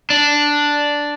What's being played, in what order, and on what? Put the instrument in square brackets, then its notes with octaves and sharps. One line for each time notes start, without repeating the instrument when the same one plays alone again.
[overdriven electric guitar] D4